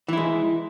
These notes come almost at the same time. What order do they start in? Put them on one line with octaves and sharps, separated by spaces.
E3 E4 G#3